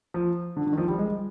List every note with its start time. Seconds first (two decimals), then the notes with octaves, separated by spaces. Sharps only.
0.14 F3
0.57 D3
0.67 D3
0.73 D#3
0.78 F3
0.88 G3
0.98 G#3